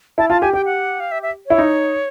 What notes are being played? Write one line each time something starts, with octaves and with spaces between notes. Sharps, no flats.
E4 A5
F4 A5
G4 G#5
G4 G5
F#5
F5
E5
E5
E4 C#5
D#4